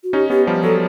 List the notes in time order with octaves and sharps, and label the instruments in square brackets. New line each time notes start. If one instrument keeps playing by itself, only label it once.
[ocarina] F#4
[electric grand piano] C#4 D#4 [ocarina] G4
[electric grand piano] B3 C#4 [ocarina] G4
[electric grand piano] F3 G3
[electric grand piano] F#3 [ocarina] A4